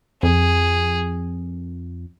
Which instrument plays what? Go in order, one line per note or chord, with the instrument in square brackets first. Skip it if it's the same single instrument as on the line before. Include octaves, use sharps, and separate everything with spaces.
[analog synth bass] F2 [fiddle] G#4